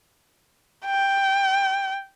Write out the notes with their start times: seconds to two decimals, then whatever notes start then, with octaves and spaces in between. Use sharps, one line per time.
0.86 G5